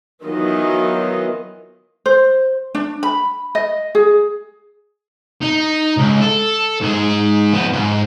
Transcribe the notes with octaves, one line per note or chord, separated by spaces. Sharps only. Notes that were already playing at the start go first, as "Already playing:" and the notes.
D#3 E3 F#3 B3 F4 D#5
C5
D4
B5
D#5
G#4
D#4
C#2
A4
G#2 G#4
F3 B3
G#2